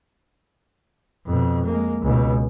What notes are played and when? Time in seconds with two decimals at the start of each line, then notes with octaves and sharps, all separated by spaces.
1.26 F2 B2
1.65 G#3 A#3
2.02 C#2 B2